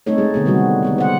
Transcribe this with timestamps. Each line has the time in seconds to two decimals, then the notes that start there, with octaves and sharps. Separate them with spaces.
0.06 A3 C4 C#4 D#4 A4 C#5
0.18 G#3 G#4
0.34 D3 B3 G#4
0.45 C3 D#3 G3 C4 F#4
0.83 B3 D#4 G4
0.98 C5 F#5